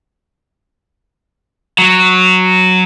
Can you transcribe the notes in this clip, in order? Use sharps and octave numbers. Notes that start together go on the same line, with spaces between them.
F#3